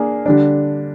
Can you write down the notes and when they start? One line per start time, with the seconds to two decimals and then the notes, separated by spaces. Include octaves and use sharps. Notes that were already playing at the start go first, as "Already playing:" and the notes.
Already playing: A#3 D4 G#4
0.26 D3 G3 D4